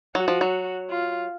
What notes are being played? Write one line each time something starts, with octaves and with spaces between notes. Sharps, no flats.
F#3 F#4
F3
F#3
F4